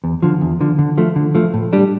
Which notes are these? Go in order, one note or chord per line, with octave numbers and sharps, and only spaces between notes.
E2
D3 F3
E2
D3 F3
D3
F3 A3
D3
F3 A3
A2
G3 D4